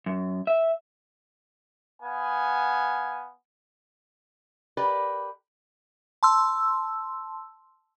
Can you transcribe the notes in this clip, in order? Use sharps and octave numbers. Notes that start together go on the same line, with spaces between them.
F#2
E5
B3 F5 G#5
G4 A#4 B4 D5
A5 C6 E6